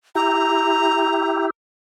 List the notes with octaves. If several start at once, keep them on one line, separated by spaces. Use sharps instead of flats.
E4 G4 A#5